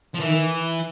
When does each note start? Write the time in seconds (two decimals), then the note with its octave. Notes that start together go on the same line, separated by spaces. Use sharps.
0.14 F3
0.20 D#3 E3